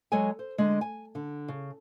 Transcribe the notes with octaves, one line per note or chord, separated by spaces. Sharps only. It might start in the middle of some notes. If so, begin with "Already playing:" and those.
F#3 G#3 A4 C#5 G#5
C5
D3 G#3
G#5
D3
C#3